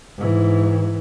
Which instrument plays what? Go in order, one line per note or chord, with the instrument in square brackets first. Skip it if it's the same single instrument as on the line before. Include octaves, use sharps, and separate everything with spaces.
[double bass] G#2 E3